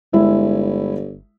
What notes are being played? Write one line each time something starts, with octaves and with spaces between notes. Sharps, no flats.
G1 G#3 E4 E5